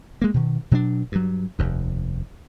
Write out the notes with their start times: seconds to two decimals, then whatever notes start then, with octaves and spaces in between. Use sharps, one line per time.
0.22 G#3 A#3
0.34 B2 D#3
0.71 B2 F#3 C#4 D4
1.12 G2 F#3
1.59 F1 D#2